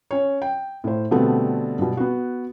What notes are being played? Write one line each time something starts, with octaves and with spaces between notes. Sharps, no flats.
C#4 C#5
G5
A2 C5
B2 D3 G3 A3 B3 C4
G2 B2
B3 F#4